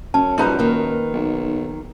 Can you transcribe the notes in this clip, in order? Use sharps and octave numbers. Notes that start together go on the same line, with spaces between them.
F#2 C#4 A5
F3 G3 D#4 B4 A#5
D#3 A#3
B1